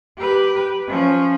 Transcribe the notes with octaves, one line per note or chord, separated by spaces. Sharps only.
G4 B4
F3 C#4